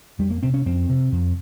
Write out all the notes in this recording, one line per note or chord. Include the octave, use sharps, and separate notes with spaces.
F2 G3
A#3
C3 C4
C#4
F2 C4
C3
F2